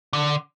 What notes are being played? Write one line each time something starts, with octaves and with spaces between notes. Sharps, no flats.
D3